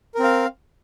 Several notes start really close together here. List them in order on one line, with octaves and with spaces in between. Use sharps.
A#4 C4 F5